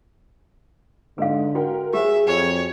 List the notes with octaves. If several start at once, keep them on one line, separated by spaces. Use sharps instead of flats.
G#2 D3 D#4 B4 F5
F#4 A#4 F#5 G5
F#3 G4 G#4 C5 E5
F2 C#5 G#5